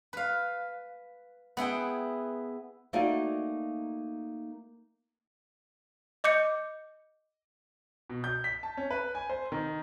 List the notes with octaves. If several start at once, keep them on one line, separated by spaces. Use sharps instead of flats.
B4 F5
B3 E4 G#4 G5
A3 A#3 D#4 F#4 D5 G#5
D#5 D6 G6 C#7
B2
G6
B6
A5
C#4
B4
G#5
C5
D#3